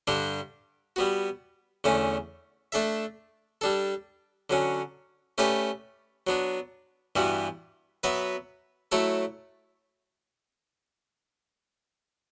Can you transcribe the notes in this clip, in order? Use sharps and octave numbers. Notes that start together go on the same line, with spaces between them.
G2 D3 G3 D4 G4
G3 B3 F#4
E2 D3 A3 C#4
A3 D4 A4 E5
G3 D4 A4
D3 F#3 C#4
A3 C#4 G4 B4 D5
F#3 B3 D4
G2 E3 G3 B3 F#4
F#3 B3 F#4 B4 E5
F#3 A3 E4 A4 C#5